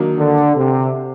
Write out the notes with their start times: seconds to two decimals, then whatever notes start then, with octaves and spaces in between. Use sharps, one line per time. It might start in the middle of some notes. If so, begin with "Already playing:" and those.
Already playing: D#3 F#3 A#3 D4
0.18 D3
0.56 C3